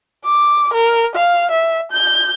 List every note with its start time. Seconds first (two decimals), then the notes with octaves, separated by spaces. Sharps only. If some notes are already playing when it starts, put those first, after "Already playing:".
0.25 D6
0.74 A#4
1.16 F5
1.51 E5
1.92 G6